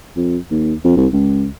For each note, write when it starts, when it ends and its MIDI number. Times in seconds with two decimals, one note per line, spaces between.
0.16 0.37 41
0.51 0.74 39
0.84 0.92 41
0.97 1.07 36
1.13 1.48 37